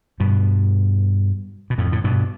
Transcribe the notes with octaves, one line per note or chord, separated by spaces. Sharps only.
G2 B2
B2
F2 A2
A2
G2 B2